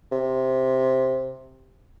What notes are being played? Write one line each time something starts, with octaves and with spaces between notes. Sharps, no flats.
C3